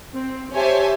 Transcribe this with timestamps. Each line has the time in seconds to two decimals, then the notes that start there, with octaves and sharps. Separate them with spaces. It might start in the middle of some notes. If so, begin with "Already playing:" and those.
0.13 C4
0.52 G4 C5 C#5 E5 G#5 A5